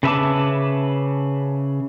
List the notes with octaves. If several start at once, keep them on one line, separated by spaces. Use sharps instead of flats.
C#3 B4 E5 A5 D6